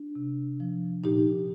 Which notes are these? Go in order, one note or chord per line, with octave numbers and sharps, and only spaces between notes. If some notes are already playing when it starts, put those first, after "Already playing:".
Already playing: D4
C3
F3
A#2 D#4 G4